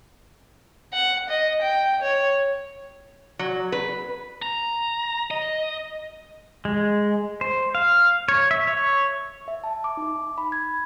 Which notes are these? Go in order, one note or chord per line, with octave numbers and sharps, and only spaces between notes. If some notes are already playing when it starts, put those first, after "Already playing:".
F#5
D#5
G5
C#5
F#3
B4
A#5
D#5
G#3
C5
F5
C#5
E5
C#5
E5
A5
D6
D#4
B5
G#6